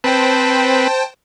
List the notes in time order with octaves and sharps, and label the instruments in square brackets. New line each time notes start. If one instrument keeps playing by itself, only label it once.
[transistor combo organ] C4 B4 [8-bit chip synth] C5 G5 A5